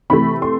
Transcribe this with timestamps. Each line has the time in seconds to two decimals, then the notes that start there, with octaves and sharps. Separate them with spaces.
0.10 C3 E3 A3 B5
0.42 C6